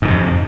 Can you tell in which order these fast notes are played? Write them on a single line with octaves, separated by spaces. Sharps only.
G#2 D#3 C3 F2